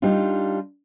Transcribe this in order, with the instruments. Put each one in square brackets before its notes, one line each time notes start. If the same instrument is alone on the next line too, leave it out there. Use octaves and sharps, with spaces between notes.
[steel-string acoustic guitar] G3 D4 D#4 F4